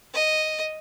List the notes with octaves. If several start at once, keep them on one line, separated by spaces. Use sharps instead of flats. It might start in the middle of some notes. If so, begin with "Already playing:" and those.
D#5